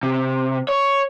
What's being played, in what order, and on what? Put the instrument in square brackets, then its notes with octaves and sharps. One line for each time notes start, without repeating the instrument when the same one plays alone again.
[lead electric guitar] C3
C#5